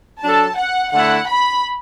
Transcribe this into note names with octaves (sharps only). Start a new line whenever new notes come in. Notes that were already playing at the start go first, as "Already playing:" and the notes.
F#3 D4 A4 A5
F#5
D3 A3 E4 F#5
B5